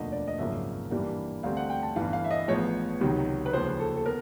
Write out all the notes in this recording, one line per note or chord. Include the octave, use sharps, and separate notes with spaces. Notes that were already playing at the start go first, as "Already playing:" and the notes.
Already playing: E1 D2 D3 F3 A#3 D#5
D5
D#5
G#1 F#2 C#3 F3 A#3 E5
G2 E3 G3 A#3
D2 D3 G3 C4 F5
F#5
G5
A5
G1 G2 E3 F5
F5
E5
D#5
A1 A2 F3 G#3 B3 C#5
C#2 C3 D#3 F#3
B4
D#2 C#3 F3 C5
A4
A4
B3 A#4